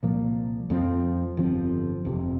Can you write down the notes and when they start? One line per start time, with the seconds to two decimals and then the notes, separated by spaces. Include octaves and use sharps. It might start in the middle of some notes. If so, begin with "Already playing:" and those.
0.03 C2 A#2 F3 A#3
0.70 F2 F3 C4
1.37 G1 F2 F3 C4
2.05 F1 F2 C3